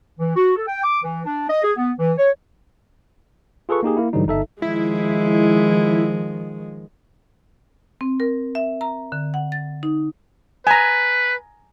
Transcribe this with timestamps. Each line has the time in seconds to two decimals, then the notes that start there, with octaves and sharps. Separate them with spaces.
0.19 E3
0.36 F#4
0.56 A4
0.68 G5
0.84 D6
1.03 E3
1.26 D4
1.49 D#5
1.63 G#4
1.77 B3
1.98 E3
2.18 C#5
3.69 F4 G#4 A4 B4 C#6
3.83 A#3 D#4 G4 G#4
3.97 A#3 E4
4.13 G#2 D3 E3 F#3 G3 D#4
4.27 G1 D#4 A4 E5
4.62 D#3 F3 G#3 E4
8.01 C4
8.20 A#4
8.55 E5
8.81 A#5
9.12 D3
9.34 F#5
9.52 A6
9.83 D#4
10.67 B4 G#5 A#5